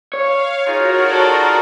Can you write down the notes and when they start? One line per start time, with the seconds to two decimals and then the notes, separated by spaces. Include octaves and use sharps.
0.14 C#5 F5
0.66 D#4 F4 F#4 G#4 A#4
1.08 A4 D5